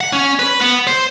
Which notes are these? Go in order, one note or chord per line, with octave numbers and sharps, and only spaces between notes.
F#5
C#4
B4
B3
C5